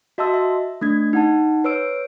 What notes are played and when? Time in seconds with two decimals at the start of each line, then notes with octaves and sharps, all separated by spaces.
0.18 F#4 D#5 E5 A5 C6 E6
0.34 E5
0.81 A3 D4 G#6
1.13 D#4 F#5 A5
1.64 B4 C#5 E6 D7